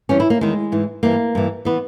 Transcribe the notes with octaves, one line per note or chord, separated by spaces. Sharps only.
G2 E3 C#4
E4
A#3
E2 D#3 G#3
G#2 E3
G2 E3 A#3
G2 E3
E3 B3